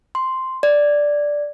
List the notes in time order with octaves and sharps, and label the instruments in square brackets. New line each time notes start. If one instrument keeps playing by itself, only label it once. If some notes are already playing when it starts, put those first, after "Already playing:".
[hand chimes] C6
D5